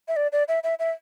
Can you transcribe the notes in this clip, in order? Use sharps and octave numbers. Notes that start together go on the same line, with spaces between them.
E5
D5
D5
E5
E5
E5